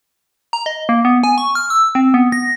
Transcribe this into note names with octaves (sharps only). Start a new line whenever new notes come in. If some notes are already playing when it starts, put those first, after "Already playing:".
A#5
D#5
A#3
B3
G#5
C#6
F6
E6
C4
B3
A#6